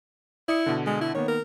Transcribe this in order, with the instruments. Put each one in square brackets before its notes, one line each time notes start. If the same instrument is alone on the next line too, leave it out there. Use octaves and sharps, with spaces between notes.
[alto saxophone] E4 [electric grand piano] D5 D#6 C#7
[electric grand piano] B2 D3
[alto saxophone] G#3
E4
[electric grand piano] D#3 A#3 B3 [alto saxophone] C#5
[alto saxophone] A#4